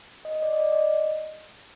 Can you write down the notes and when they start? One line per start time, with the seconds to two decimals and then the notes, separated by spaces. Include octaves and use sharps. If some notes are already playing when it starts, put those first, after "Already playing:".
0.25 D#5
0.35 D#5
0.42 D5
0.53 D#5
0.60 D5
0.72 D#5